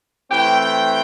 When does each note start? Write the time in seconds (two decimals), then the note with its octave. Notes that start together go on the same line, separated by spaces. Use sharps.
0.30 E3 A3 C4 G5
0.61 G5